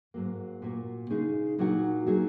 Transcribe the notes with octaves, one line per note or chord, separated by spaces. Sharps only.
G#2 F#3 A#3
A#2 A#3 F#4
C#3 G#3 D#4 G#4
A#2 F#3 A#3 D#4 F#4
F#3 D#4 G#4